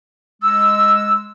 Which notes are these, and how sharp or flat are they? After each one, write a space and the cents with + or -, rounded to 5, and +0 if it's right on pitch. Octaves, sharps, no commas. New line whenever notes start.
G#3 +0 E6 +0